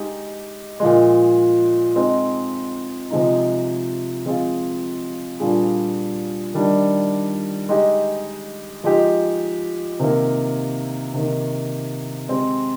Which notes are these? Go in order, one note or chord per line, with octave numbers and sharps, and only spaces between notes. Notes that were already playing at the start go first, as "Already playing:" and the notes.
Already playing: G#3 D#4 G4
A#2 F3 G#3
G#3 C4 D#4
C3 F3 G#3 D#4
F3 G#3 C4 F4 G#4
A#2 G3 D4 F4 G#4
D#3 G3 D4
G#3 D#4 G4
F3 G#3 D#4 G4
C3 D#3 A#3
C3 D#3 A#3
G#3 C4 G4